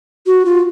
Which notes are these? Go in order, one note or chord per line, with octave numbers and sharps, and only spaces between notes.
F#4
F4